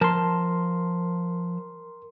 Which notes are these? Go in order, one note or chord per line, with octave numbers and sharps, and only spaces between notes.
F3 A#4 A5 C6